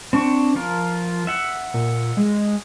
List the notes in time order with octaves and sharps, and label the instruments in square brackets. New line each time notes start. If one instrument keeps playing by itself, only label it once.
[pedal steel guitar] C4 D4 C#6
F3 F4 A#4
E5 F#5
[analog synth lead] A#2
G#3